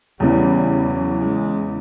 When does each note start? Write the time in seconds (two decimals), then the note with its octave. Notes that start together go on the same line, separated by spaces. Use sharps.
0.20 E2 C#3 E3 G3
0.88 F#3
1.21 G#3